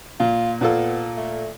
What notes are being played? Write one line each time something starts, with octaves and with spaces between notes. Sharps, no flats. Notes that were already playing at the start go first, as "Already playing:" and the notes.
A#2 F4
A#2 B3 F4 A4
A3